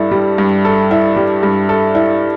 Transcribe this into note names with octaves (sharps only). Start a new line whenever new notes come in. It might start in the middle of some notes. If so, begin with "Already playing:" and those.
Already playing: G2 G3 E4 A4
G3
G2
A4
E4
G3
G2
A4
E4